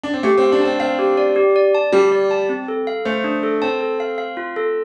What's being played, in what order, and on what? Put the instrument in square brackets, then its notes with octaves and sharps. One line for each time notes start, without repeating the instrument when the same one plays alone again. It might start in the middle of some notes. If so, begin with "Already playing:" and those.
[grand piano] D4
C4
[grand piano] A3 [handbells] G4
[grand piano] C4
[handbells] F5
[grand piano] D4
[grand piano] C4 [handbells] A5
[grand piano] C4 [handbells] F5
[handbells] G4
D5
G4
D5
A5
[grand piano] G3 [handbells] G4
[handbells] D5
A5
C4
A4
F5
[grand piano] A3 [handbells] C5
[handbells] D4
A4
[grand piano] C4 [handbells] A5
[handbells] A4
F5
F5
F4
A4